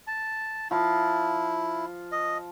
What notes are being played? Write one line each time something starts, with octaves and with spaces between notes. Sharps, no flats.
A5
F3 E4 F5
D#5